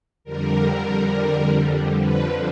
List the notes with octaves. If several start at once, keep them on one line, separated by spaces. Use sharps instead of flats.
F2 D3 G3 A#4
F2 D3 F3 B4